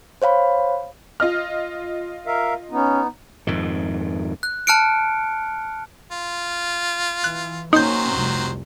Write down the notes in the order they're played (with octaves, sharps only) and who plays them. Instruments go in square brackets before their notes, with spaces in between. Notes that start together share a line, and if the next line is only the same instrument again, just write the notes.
[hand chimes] C5 C#5 F5 B5
[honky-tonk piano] F4 D#5 F6
[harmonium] A#4 E5 F5
[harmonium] B3 D#4 [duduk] C#4
[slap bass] F2 G#2 D#3
[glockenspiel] F#6
A5 F6 F#6 C#7 D7
[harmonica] F4
[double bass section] E3 [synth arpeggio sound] F#6
[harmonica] D#3 F#3 C5 [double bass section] A#3 C#4 [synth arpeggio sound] D#4 G6
[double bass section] F1 C2